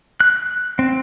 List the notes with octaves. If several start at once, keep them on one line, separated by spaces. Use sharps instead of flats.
F#6
C4